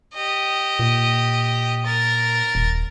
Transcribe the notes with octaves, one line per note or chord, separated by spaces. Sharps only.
G4 D#5
A#2
A#4 A6
D#1